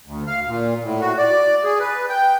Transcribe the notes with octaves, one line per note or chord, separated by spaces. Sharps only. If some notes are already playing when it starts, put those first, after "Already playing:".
D2
F5
A#2
A2
F#4
D5
G#4
B4
G5